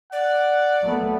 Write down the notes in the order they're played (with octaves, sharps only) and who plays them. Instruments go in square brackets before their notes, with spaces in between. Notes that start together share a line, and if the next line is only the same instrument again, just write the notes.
[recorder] D5 [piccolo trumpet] F#5
[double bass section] F#3 A3 B3